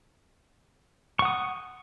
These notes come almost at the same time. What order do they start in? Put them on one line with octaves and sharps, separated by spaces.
C#6 F#5 D#6